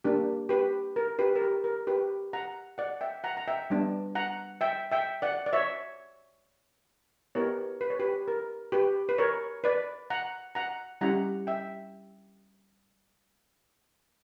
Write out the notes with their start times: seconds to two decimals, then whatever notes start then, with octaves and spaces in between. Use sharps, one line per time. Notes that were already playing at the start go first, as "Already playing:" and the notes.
0.04 A#3 D4 G4
0.49 G4 B4
0.96 A#4
1.19 G4 B4
1.35 A#4
1.42 G4
1.64 A#4
1.87 G4 B4
2.33 F#5 A#5
2.78 D5 F#5
3.01 E5 G5
3.24 F#5 A#5
3.37 A#5
3.48 E5 G5
3.70 G3 B3 D4
4.15 F#5 A#5
4.61 E5 G5
4.92 E5 G5
5.22 D5 F#5
5.46 D5
5.53 C#5 E5
7.35 B3 E4 G4 A#4 C#5
7.81 B4
7.90 C#5
7.99 G4 B4
8.28 A#4
8.72 G4 B4
9.09 B4
9.18 A#4 C#5
9.64 B4 D5
10.10 F#5 A#5
10.55 F#5 A#5
11.01 G3 C#4 E4 G4 F#5 A#5
11.47 E5 G5